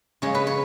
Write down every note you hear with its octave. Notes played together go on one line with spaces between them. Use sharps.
C#3 G#3 C#4 C#5
B4
C#5